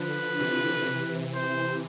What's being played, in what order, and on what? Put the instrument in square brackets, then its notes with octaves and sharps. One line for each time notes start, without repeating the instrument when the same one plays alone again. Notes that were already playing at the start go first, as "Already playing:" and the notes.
Already playing: [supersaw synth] D3 F3 [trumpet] B4
[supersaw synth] C3 E3
C3 E3
[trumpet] C5